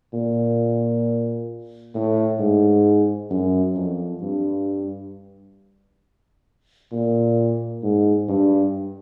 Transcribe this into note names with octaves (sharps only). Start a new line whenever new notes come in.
A#2
A2
G#2
F#2
F2
G2
A#2
G#2
G2